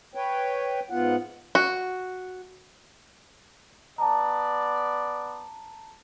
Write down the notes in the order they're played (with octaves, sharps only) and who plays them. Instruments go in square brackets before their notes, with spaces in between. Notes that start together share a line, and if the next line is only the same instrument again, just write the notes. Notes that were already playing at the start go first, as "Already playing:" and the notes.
[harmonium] B4 C#5 G5
G#2 B3 F4 F#5
[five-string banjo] F#4
[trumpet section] B3 D5 [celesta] A5 A#5